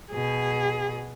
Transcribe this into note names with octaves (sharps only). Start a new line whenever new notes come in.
B2 G#4